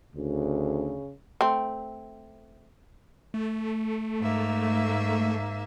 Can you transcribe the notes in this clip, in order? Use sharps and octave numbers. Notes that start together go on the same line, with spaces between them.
D2 C#3
A3 C4
A3
G#2 A#3 E5